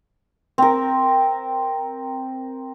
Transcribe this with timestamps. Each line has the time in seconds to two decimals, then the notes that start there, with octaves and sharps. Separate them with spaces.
0.58 C4 A#4